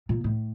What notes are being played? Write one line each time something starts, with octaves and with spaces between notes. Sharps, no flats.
A#2
A2